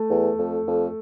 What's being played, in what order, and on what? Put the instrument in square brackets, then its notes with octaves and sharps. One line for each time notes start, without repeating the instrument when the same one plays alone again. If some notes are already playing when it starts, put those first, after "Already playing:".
Already playing: [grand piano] A3
[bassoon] E2
F2
F2